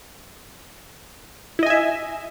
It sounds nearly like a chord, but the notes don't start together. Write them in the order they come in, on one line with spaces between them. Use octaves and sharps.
E4 D#5 G#5 E5